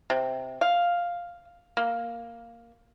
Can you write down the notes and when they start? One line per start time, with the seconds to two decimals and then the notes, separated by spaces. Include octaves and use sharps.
0.10 C3
0.61 F5
1.77 A#3